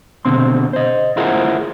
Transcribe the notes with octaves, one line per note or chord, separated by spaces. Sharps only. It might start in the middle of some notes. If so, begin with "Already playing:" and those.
B2 D3 C4 C6
C5 D#5
E4 F4 G#4 A#4 C5 F#5